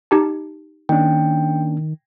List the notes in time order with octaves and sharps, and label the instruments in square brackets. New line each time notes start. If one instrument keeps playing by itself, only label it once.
[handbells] D#4 G4 A5
[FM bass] D#3 [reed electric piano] A#3 C#4 D4 [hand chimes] G5